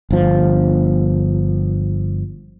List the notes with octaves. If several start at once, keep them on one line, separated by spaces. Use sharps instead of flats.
G1 F3